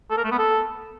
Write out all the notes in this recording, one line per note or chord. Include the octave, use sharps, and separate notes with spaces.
A4
A#4
A3
B3
A4